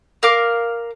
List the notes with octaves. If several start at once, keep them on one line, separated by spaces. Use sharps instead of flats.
A#4 F5 D6